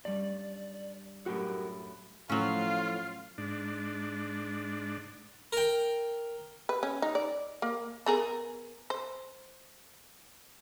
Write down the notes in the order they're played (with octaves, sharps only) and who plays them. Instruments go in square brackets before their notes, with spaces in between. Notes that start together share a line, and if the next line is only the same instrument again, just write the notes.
[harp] G2 G3 C#4 [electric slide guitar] D5
[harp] F#2 A2 C#4 [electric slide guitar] F#4 G4 A#4
[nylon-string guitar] A2 F3 [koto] F#3 C#4 [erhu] F4
[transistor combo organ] G#2 D4
[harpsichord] A#4 G5
[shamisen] B4
C#4
D#4
D5
A#3
B3 G#4 A#4
C5